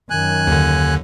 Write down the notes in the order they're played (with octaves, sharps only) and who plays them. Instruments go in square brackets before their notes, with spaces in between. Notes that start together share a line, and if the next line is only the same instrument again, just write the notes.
[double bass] F#2 D#3 [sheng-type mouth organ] G#5 F#6
[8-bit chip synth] D#2 D3